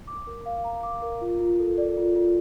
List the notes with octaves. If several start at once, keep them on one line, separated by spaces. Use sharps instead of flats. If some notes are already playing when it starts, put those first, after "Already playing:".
D6
A#4
F5
A#5
D6
A#4
F4
F4
A4
D5
F4
F4